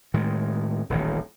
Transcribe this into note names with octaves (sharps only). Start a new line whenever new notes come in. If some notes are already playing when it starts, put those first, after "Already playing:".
A2 D#3 G#3
D#1 A1 D#3